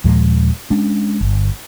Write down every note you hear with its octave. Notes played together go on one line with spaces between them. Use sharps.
D#2 A#2 F3 G#3
G#3 C#4 D4
G1